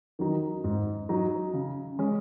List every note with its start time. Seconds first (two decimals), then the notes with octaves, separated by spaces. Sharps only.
0.19 D#3 F#3 D#4
0.64 G#2
1.09 F#3 D#4
1.54 C#3
1.99 G#3 C#4